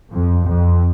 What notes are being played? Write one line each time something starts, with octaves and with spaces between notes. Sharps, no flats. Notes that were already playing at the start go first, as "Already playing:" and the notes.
F2
F2